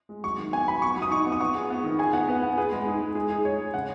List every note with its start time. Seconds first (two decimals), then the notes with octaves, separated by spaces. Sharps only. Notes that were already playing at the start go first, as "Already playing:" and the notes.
0.09 G#3
0.24 F#3 C#6
0.38 D#3
0.52 B3 G#5
0.67 F#3 B5
0.82 B3 C#6
0.96 F#3
1.02 D#6
1.11 D#4 C#6
1.26 B3
1.32 D#6
1.40 B3 C#6
1.54 G#4
1.70 B3
1.84 D#3
1.99 G#4 G#5
2.13 B3 F#5
2.28 B3 B4
2.42 B3
2.57 G#4 B4
2.72 G#3
2.87 D#4 G#4
3.01 G#3
3.15 G#3 G#4
3.30 D#4 G#4
3.45 G#3 C#5
3.59 G#3
3.74 C#3 F#5